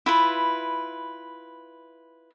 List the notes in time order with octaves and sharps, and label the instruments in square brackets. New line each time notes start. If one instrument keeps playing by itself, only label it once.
[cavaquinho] E4 F4 B4